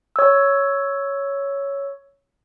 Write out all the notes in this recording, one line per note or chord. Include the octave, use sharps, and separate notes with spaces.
C#5 E6